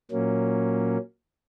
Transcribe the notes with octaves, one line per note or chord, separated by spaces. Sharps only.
A#2 F#3 A#3 C#4